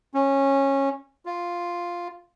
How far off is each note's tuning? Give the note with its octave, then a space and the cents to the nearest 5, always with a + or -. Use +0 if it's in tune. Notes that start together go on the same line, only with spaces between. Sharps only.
C#4 -15
F4 +0